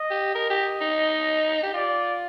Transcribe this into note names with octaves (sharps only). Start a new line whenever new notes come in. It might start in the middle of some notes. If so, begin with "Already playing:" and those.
Already playing: D#5
G4
A#4 D#5
G4
D#4
G4
F4 D5